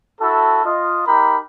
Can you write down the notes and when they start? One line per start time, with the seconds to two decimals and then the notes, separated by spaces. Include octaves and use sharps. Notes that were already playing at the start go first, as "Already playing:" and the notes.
0.21 E4 F#4 A4
0.65 F4 D#5
1.06 D#4 G4 A#4 B5